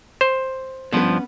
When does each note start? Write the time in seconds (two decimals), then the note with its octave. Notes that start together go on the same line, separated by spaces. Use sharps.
0.21 C5
0.92 G2 F3 B3 C#4 B4